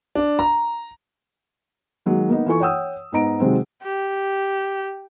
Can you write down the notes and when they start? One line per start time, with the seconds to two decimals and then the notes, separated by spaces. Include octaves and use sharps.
0.15 D4
0.39 A#5
2.06 D#3 F#3 G#3 A#3
2.28 A#3 B3 D#4
2.46 E3 F4 A4 G#5 C#6
2.60 C#5 F#5 G5 D#6 E6
3.12 G#2 B3 D#5 A#5 D7
3.40 C3 D#3 F#3 G#3 C4
3.83 G4